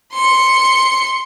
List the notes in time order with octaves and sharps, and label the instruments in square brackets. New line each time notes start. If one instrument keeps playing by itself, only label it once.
[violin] C6 C#7